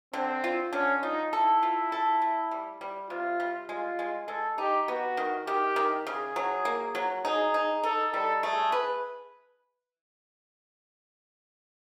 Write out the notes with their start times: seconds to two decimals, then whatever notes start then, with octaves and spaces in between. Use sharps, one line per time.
0.13 D3 C4
0.44 F4
0.73 D3 C#4
1.02 D#4 F4
1.32 E4 A4
1.63 F4
1.92 A4
2.22 A3
2.51 G3
2.81 G3
3.10 C3 F4
3.40 G3
3.69 G#3 F4
3.99 G#3
4.28 G#3 A4
4.58 D#4 G4
4.88 B3 F#4
5.17 D#3
5.47 D#3 G4
5.76 D#3
6.06 C#3 G#4
6.36 F#3
6.65 A#3
6.95 F#3
7.25 D#4 G#4
7.54 D#4
7.83 D#4 A4
8.14 G3 A4
8.43 A3 G#4
8.72 B4